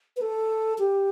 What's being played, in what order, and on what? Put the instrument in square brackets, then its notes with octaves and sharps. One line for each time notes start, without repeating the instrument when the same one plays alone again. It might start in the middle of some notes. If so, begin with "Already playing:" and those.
[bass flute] B4
A4
G4